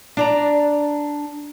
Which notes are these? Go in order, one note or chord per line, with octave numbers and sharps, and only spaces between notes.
D4 D5 A#5